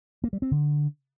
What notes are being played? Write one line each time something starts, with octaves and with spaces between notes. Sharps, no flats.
A#3
G3
C4
D3